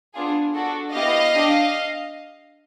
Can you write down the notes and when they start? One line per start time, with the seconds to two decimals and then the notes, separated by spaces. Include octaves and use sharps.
0.14 B3 D4 F4 G#4
0.54 D4 F#4 A4
0.93 B3 E4 G4 D#5 F5
1.33 D4 G4